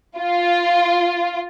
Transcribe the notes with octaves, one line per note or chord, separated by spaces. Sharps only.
F4